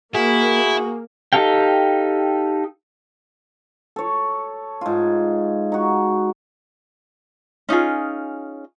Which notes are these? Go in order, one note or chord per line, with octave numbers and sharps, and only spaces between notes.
A#3 E4 F#4 G#4
D#4 G4 A4 F5 G5
A4 C#5
G#2 F4
D#4 F#4
C#4 D#4 F4 G#4